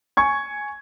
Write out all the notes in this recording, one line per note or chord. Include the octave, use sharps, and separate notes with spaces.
G#5 C#6 G#6